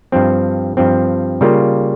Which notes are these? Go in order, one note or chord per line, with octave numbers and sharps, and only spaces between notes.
G2 F3 C4
G2 F3 C4
C#3 G3 A#3 F4